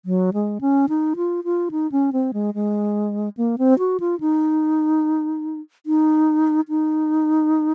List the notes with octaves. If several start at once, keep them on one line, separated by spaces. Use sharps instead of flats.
F#3
G#3
C#4
D#4
F4
F4
D#4
C#4
C4
G#3
G#3
A#3
C4
F#4
F4
D#4
D#4
D#4